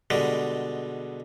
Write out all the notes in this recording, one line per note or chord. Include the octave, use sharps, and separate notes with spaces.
B2 D3 G3 G#3